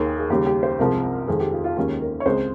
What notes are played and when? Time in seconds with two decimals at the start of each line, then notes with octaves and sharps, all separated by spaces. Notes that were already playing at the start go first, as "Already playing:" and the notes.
Already playing: D#2 D#3 A#3 G#4
0.18 G#4
0.30 D#2 C#3 G3 G4
0.46 G4
0.63 C5
0.79 C2 C3 F3 G#3 A#4
1.28 F2 D#3 G#3 G#4
1.40 G4
1.52 F4
1.64 F4
1.76 D#2 D#3 G#3 C#4 G4
2.01 A#4
2.20 C#5
2.25 C#2 C#3 G#3 C4 C5